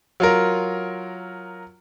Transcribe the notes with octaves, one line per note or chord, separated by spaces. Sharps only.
F#3 F4 A#4